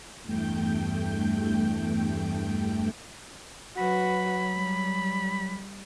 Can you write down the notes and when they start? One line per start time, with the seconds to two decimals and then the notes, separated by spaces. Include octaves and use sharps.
0.23 E2 G2 A3 G5 G6
3.78 F#3 F#4 B4 B5
4.54 G3